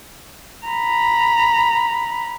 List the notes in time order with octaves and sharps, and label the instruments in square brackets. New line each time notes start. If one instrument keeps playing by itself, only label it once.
[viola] A#5 B5